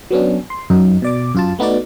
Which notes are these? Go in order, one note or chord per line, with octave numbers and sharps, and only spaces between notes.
F#3 B3 C#4 D4
C6
F#2 F#3 D#4
B2 D5 D6
F#2 F4 A5
A3 B3 D#4 F#4 D5